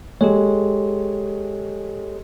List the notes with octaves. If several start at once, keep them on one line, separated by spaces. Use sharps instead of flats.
G#3 G4 A4 C#5